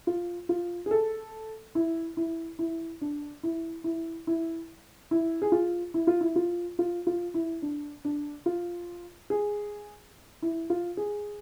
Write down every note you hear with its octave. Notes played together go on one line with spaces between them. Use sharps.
F4
F4
G#4
A4
E4
E4
E4
D4
E4
E4
E4
E4
G#4
F4
E4
F4
E4
F4
F4
F4
E4
D4
D4
F4
G#4
E4
F4
G#4